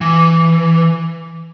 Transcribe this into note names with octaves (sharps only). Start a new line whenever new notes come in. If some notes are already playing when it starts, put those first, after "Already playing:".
E3